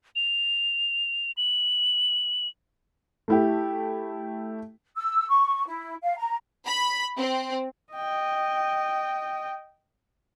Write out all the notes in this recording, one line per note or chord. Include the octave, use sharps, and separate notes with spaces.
F7
F#7
A3 E4 G4
E6
C#6
E4
F5
A#5
B5
C4
D#5 G5